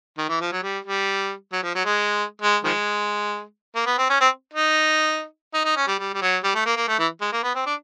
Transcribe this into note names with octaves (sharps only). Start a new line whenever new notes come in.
D#3
E3
F3
F#3
G3
G3
F#3
F3
F#3
G#3
G#3
D#3 F3 G#3
A#3
B3
C4
C#4
C4
D#4
D#4
D#4
C#4
G3
G3
G3
F#3
G3
A3
A#3
A#3
A3
E3
G#3
A#3
B3
C4
D4